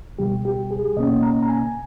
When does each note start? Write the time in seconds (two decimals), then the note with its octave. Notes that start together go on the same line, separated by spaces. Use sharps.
0.19 C#2 B2 G3 G4
0.45 G4
0.71 G#4
0.97 B2 A#3 C#4 D#5
1.23 A#5
1.43 A#5
1.49 G#5